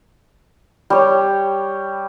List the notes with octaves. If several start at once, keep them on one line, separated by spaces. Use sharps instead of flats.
G3 C#5